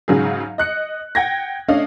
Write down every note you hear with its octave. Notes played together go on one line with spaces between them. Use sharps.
G#2 C#3 F#3 G#4
D#5 F#6 C#7
F#5 G5 G#6 A#6
A3 C#4 D4 D#5 F5